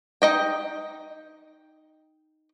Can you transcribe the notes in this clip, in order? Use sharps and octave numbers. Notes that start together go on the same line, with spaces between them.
D#4 D#5 G5